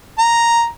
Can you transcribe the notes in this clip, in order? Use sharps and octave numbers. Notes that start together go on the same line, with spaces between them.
A#5